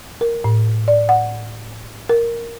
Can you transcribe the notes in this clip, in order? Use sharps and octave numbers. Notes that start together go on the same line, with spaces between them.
A#4
A2
D5
F#5
A#4